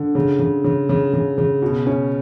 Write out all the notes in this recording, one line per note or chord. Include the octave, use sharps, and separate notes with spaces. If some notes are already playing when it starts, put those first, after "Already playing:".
Already playing: D3
C#3
C#3
C#3
C#3
C#3
C#3
B2
C#4